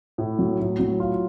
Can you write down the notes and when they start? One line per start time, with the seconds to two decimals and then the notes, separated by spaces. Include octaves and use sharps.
0.18 A2
0.39 F#3
0.60 A2
0.79 F#3
1.00 F4